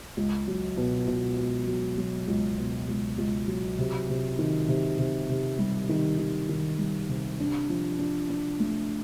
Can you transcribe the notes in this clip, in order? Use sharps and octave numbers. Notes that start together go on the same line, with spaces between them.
C#2
F#3
B2
B2
B2
F#3
F#3
C#2
B2
C#2
C#2
F#3
C3
C3
D#3
C3
C3
C3
G3
D#3
D#3
D#3
G3
C3
D4
F3
D4
D4
A3